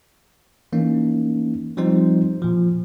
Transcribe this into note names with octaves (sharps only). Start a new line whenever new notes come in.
E3 A#3 C#4 D#4
F3 G3 C4 D#4 C5
A#2 F3